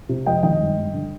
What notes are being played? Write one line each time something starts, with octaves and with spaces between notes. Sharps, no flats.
C3
F2 D#5 G5
D#3 D#5 G5
G2
G2
D3